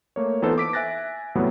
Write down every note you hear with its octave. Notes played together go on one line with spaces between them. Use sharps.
A3 A#3 C#5
E3 B3 D#4 F4 A4 C5
D6 B6 D7
E5 G#5 F#6 A6 A#6
E2 A2 C3 F#3 G3 B3